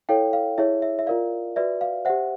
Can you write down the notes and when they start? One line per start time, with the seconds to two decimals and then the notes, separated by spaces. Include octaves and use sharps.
0.09 E4 A4 C#5 F5 G5
0.33 F5
0.58 E4 G#4 C#5 E5
0.82 E5
0.99 E5
1.07 F4 A#4 D5 F5
1.56 F#4 B4 D5 E5
1.81 F5
2.05 G4 C5 E5 F#5